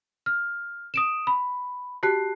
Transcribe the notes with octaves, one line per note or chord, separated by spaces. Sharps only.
F6
D#6 D7 E7
B5
F#4 G4 A5 F#6 C7